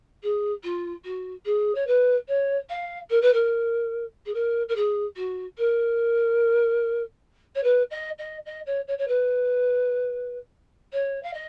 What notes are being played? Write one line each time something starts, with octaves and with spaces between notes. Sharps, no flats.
G#4
F4
F#4
G#4
C#5
B4
C#5
F5
A#4
B4
A#4
G#4
A#4
A#4
G#4
F#4
A#4
C#5
B4
D#5
D#5
D#5
C#5
C#5
C#5
B4
C#5
F5
D#5